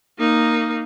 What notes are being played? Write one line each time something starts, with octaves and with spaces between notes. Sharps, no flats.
A#3 D#4